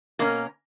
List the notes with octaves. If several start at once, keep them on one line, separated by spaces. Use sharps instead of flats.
B2 A#3 C#4 A#4